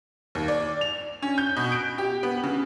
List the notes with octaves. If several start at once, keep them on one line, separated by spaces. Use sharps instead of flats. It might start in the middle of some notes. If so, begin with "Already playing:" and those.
D#2
D5
F7
C#4
G6
B2
D7
G4
B3
C#3